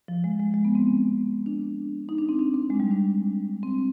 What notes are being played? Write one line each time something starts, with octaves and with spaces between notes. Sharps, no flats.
F3
G#3
G#3
G#3
B3
C4
D4
D#4
D4
C4
D4
C4
G#3
G3
D4
C4